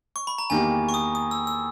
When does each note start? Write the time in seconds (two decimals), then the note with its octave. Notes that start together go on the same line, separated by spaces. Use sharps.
0.16 C#6
0.27 B5
0.38 A#5
0.50 E2 D#3 A#3 D#4 G4 G#5
0.89 C#6
0.94 D#6
1.15 D#6
1.31 E6
1.47 E6